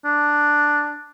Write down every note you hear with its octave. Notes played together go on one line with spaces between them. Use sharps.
D4